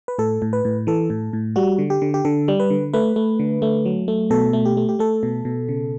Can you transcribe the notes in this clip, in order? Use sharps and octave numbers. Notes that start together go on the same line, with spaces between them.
B4
A2 A4
A2
B4
A2
E3 A4
A2
A2
G3 F#4
D3
G4
D3
G4
D3 A4
G3
B4
D3
A3 B4
A3
D3
A3
F#3
A3
B2 A4
A3
G4
A3
G4
A3 A4
B2
B2
C#3